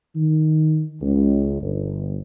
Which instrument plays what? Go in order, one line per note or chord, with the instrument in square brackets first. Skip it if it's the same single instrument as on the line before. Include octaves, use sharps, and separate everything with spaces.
[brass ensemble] D#3
C#2
G1